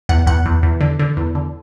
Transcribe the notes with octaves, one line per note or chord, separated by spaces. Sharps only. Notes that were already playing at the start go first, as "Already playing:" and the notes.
E2 F#5
E2 F#5
E2
E2
D3
D3
E2
D3